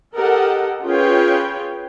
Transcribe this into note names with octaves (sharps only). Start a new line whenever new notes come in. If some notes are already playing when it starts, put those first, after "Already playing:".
G4 A4 A#4 D#5 F#5
C#4 F4 G#4 B4 C#5 G5